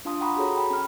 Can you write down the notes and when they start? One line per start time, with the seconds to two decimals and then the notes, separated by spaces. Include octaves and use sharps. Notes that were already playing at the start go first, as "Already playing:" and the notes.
0.05 D4 F4 F5 A5 C6 D#6
0.21 F#5 G5 A#5 B5 C#6 D#6
0.37 F#4 G#4 A4 C#5 A#5
0.56 G5 B5
0.70 C#4 F6